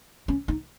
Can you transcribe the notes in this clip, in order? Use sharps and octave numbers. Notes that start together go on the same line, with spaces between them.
C#4
D#4